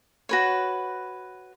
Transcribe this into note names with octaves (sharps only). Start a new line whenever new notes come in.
F#4 B4 C#5